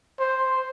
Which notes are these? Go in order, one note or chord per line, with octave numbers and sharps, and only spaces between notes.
C5